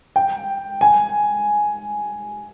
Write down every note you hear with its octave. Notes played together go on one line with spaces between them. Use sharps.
G5
G#5